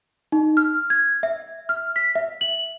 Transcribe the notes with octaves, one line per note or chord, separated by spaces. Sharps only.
D#4
F6
G#6
E5
F6
B6
E5
F#7